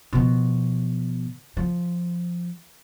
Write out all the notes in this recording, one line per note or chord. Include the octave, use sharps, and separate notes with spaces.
B2 F3
F3